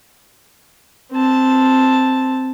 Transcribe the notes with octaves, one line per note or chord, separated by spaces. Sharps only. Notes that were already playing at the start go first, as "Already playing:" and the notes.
C4 A5